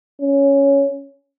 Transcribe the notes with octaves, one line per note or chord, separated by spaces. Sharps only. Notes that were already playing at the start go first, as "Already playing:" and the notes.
C#4